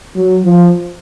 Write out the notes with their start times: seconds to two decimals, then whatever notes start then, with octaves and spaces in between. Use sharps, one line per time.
0.16 F#3
0.45 F3